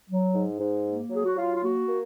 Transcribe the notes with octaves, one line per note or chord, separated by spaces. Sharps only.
F#3
G#2
G#2
A#3
F#3 G#4
F#4
F#3 F4
F4
A#3 F#4
A#3